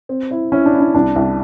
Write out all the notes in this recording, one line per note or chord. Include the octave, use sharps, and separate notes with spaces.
C4
E4
C#4 E4
D4
E4
D4
C2 D4
C2